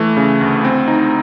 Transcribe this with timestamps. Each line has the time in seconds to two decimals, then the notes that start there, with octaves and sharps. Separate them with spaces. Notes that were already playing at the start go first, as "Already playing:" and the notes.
Already playing: E3 A3
0.17 C#3
0.41 D2
0.64 C4
0.88 D#4